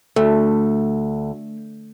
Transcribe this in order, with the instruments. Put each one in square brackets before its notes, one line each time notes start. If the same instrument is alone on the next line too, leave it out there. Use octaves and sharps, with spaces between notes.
[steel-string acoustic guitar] D2 [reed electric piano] A3